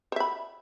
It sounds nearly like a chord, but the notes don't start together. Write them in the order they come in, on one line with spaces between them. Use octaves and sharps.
C5 E5 B5